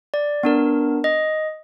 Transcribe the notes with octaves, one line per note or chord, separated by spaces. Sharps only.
D5
B3 D4 A#4
D#5